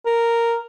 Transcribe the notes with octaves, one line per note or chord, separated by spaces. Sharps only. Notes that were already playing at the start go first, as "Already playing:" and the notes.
A#4